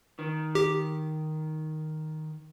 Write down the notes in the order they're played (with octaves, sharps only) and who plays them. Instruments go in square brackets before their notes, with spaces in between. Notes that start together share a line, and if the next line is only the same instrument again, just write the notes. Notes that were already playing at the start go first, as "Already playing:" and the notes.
[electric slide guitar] D#3
[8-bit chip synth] G4